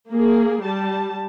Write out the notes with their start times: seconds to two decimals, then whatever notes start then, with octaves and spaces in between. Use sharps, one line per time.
0.10 A#3 G#4
0.62 G3 A5